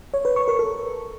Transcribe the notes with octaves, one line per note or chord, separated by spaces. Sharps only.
C#5
B4
C#6
A#4
A4